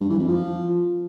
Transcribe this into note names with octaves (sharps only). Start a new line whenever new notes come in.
G2
E3
F2
F3